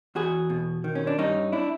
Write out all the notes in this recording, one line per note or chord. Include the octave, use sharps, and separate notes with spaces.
E2 F#4 G#4
B2
D#3
C#4
D4
G2 C#4 D#4
D4 E4